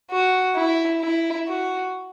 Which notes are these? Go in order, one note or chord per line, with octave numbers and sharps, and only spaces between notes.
F#4
E4
E4
F#4